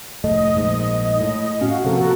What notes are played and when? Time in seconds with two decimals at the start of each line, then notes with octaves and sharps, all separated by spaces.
0.24 F1 A2 A3 D#5
0.55 A#1 G#2
1.21 A2
1.61 A2 C#4 F#4 F5
1.84 C3 F3 A#3 F#4 A4 A#4